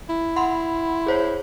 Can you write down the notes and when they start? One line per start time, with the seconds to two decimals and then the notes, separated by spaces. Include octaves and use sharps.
0.09 E4
0.36 F#5 B5 C6
1.06 G#4 C5 C#5